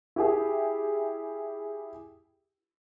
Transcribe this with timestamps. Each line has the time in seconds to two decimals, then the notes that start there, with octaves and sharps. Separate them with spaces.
0.16 E4 G4 G#4